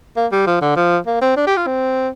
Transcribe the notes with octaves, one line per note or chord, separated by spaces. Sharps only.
A#3
G3
F3
D3
F3
A#3
C4
D4
G4
F4
C4